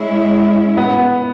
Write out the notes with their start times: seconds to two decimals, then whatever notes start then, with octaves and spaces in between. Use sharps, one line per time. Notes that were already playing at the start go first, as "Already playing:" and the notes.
Already playing: G#3 C#4 E4
0.77 B3